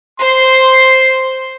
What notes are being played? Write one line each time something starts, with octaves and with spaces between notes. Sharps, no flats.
C5 C6